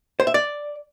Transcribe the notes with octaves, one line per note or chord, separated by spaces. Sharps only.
C5
E5
D5